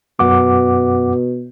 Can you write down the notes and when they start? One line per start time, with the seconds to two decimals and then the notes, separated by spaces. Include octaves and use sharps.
0.19 F#2 B2 F#5 D6